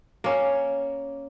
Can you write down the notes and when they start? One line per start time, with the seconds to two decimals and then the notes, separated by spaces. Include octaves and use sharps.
0.24 A#3 C#4